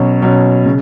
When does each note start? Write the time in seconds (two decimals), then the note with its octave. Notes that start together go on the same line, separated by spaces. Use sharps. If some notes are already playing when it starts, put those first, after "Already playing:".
Already playing: B2 F#3 C#4
0.22 B2 F#3 C#4
0.66 C#3